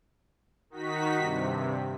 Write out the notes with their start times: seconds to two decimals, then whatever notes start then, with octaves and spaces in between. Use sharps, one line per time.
0.70 D#3 D#4 F#4 B6
1.17 G2 C3